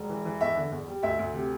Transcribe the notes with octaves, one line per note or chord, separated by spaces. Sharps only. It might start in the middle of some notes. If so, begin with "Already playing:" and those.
Already playing: E1
E3
E3
E2 E5
D3
E2
G3
D2 E5
D2
C3